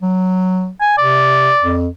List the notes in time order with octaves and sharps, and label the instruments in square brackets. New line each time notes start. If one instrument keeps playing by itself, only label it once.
[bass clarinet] F#3
[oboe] G#5
[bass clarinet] C3 [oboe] D5
[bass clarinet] F2